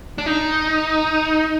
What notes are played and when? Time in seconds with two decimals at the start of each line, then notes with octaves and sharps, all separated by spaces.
0.18 D4
0.26 D#4